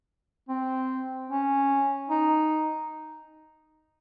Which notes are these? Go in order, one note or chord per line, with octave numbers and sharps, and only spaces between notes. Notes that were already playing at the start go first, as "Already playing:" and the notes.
C4
C#4
D#4